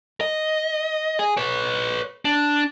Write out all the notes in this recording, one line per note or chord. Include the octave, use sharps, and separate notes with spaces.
D#5
G#4
B4 C#5
D4